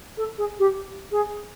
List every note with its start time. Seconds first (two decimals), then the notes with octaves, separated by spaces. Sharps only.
0.17 A4
0.38 G#4
0.59 G4
1.11 G#4